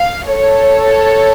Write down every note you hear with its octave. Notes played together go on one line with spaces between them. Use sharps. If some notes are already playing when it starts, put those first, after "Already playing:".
Already playing: F5
A4 C#5